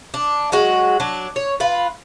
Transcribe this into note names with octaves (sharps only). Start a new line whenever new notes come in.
D4
F#3 G#3 F#4
F#3 D4
C#5
F4 B4